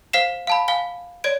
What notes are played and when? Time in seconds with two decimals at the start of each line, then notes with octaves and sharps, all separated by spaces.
0.13 C5 F5 B6 C7 E7
0.47 F5 A5 B5
0.68 F5 G#5 G7
1.24 C#5 D5 G#6 D7